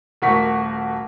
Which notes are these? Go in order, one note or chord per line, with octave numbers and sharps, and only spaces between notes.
D#1 A3 F#4 A#4 C#6 B6